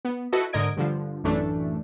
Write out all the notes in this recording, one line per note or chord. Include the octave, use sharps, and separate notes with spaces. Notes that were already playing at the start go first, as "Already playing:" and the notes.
B3
E4 F#4 A4 B4 D#5
G#2 D3 A#4 D#5 G#6 D7
G2 D3 F3
A1 F#2 E3 A3 D4